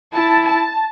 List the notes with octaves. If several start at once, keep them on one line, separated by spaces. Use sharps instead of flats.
E4 A5
A5